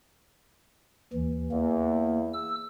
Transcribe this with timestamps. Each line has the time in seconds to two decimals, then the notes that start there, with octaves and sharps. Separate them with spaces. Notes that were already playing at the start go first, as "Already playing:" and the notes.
1.13 D#2 E3
1.52 E2 A#3
2.33 E6